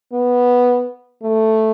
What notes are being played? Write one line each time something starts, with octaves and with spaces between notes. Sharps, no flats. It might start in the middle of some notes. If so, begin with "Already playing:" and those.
B3
A3